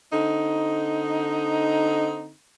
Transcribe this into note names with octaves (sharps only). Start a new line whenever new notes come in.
D3 C4 D#4